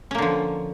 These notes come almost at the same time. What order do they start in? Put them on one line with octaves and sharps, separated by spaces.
C#4 A#3 D3 F3